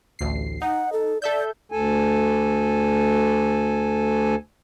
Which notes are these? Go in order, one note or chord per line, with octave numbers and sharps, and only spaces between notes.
A1 D2 C7
D#4 F#5
A4
A4 D5 E5 G6
D2 A4 G#5